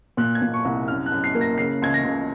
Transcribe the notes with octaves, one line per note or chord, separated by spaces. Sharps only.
A#2 F#6
G#6
A#2
C#6
C2
F#2 F6
F#6
F#2
C7
A#3
A#6
C#3 C7
C#2 G#6
A#6
C#2